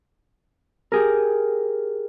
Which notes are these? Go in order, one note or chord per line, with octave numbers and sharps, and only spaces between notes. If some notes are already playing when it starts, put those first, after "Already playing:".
G4 G#4 A#4